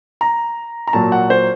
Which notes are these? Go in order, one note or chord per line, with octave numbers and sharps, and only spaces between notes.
A#5
A#5
A#2 F#3 A#3 A5
F#5
C5